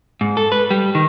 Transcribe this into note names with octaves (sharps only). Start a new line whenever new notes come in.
G#2
A4
B4
G3
D#3